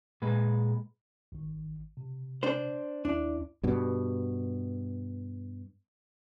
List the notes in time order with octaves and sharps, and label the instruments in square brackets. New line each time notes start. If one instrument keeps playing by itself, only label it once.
[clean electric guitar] A#2 G#3 B4
[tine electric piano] G#1 D#3
C3
[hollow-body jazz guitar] D4 C5
[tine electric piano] D#2 E4 [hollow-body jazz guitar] D4
[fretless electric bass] G2 B2